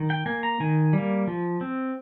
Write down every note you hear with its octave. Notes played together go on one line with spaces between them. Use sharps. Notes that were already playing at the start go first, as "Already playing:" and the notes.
Already playing: D#3
G5
A#3 G#5
A#5
D#3 G#5
G3 A#3
F3
C4